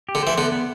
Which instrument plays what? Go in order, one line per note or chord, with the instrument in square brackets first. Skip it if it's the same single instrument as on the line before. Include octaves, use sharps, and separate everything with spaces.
[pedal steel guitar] G4
[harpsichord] D3
[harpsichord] E3 [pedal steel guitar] C5
[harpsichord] D3 [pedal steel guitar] B3
[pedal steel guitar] B3